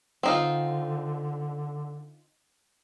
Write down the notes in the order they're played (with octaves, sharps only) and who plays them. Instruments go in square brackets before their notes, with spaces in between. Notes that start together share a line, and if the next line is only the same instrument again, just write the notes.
[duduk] D3 [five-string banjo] C4 D#4 F4